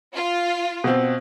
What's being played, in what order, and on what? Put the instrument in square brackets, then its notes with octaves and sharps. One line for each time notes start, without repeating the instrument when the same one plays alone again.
[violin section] F4
[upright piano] B2 C4